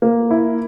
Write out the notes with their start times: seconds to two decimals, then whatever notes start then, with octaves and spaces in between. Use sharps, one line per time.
0.02 A#3
0.31 E4